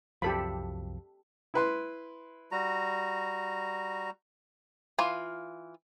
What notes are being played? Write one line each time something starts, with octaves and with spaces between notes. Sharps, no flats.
C2 F#2 F3 G4 A4 B5
E4 B4 C6
G3 F#4 A#5
E3 F4 F5